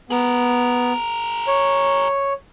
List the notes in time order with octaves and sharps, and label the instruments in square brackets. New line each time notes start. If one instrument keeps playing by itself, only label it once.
[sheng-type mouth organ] B3 [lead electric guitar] G#4 A#4
[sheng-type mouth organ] C#5